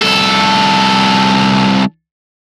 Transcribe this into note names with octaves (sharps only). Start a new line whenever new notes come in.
C2 A4